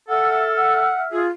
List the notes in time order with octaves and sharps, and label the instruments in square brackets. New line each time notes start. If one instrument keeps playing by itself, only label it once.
[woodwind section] A4 [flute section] E5 E6 F6 [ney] F#5
[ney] F#5
[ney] F4 [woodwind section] G#4